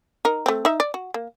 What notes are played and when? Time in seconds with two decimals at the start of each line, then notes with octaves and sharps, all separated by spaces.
0.25 D#4 A#4
0.46 A3 C4
0.65 D#4 E5
0.80 D5
0.94 F#4
1.14 A#3